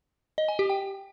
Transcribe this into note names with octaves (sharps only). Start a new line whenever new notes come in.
D#5
G#5
G4
G5